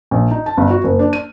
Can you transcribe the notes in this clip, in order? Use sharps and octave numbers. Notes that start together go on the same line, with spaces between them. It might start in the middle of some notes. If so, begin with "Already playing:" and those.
A#1
D#4
A5
G1
F#4
F#1
D4
D#7